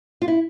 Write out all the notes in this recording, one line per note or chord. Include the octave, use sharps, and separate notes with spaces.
F4
E4